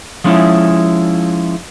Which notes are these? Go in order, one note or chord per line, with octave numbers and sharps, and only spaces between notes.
F3 G#3 C#4 D#4 E4